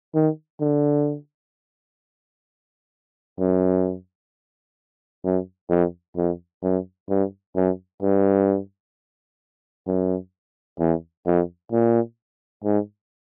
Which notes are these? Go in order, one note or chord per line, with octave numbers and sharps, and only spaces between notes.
D#3
D3
F#2
F#2
F2
F2
F#2
G2
F#2
G2
F#2
E2
F2
A#2
G#2